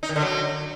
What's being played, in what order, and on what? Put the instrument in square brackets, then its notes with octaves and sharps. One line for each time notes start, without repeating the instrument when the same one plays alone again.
[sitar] D#4
D#3
D3
F#3